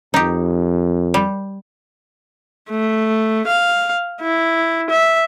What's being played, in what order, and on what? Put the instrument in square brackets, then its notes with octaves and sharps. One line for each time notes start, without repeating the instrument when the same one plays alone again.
[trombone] F2 [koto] D#4 G4
[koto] G3
[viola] A3
F5
E4
E5